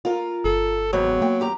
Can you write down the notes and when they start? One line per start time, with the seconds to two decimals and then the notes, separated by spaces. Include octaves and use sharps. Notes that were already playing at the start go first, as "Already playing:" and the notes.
0.05 F4 A#4
0.45 G1 A4
0.93 D#2 G#2 F#3 B3
1.22 A#3 G5
1.40 D#2 G4 A#5